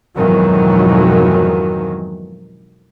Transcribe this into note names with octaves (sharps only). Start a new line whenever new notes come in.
F2 G#2 B2 D#3 E3 F#3